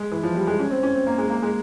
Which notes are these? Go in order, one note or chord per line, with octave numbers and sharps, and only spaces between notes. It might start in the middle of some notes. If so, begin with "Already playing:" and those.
Already playing: G#3
E3
F3
G3
G#3
C#4
C4
C#4
C4
A#3
G#3
A#3
G#3